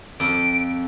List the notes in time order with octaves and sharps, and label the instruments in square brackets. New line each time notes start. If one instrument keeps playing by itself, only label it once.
[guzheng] F2 [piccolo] D7